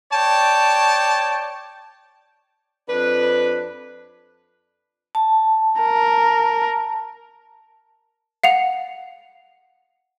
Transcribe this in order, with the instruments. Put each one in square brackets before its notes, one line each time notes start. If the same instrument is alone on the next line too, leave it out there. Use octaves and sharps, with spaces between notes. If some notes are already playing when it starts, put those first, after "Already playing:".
[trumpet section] C#5 D5 G5 A5
[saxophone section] F2 D4 B4
[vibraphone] A5
[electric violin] A#4
[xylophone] F5 F#5 F7